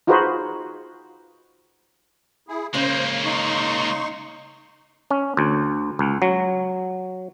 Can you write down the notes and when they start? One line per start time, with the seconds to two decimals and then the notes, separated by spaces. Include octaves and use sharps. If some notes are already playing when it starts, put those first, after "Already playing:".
0.07 D#4 F4 F#4 G#4 B4 C5
2.48 E4 G#4
2.74 C#3 G#3 A#3 C5
3.25 D#4 C6 C#6
5.11 C#4
5.37 D2
5.99 C#2
6.22 F#3